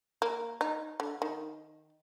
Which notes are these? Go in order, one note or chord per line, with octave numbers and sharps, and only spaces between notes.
A#3
D#4
D3
D#3